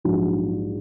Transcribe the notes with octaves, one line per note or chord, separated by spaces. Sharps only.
A#1 G#2 F#3 F#4